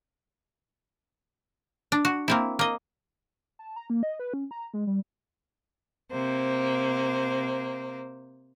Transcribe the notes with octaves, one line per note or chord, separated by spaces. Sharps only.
D4
F#4
A#3 C4 E4
A#3 D#5
A5
A#5
A#3
D#5
B4
C#4
A#5
G#3
G3
C3 A#3 C5